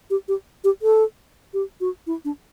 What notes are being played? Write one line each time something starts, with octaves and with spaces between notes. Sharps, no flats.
G4
G4
G4
A4
G4
F#4
E4
D4